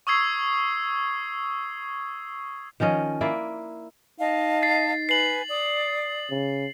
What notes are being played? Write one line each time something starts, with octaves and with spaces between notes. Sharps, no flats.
C#6 D#6 E6 G#6 C7
D#3 F3 C#4 D#5
A#3 E4 D5
D#4 D#5 F5 A5
A6 C7
B4 G#5 C7 F#7
D5 D#6
C#3